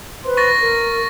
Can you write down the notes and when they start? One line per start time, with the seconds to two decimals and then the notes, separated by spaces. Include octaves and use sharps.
0.24 B4 C5 C6
0.37 C#6 A6 A#6
0.60 A#4